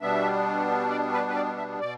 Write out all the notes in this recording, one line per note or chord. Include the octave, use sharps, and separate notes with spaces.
B2 G3 B3 D4 E5
D5
B4
B4
D5
E5
B2 D5